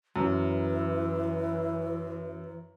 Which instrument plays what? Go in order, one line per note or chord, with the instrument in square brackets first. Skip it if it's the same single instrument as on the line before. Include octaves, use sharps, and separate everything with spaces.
[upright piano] F#2 [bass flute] E3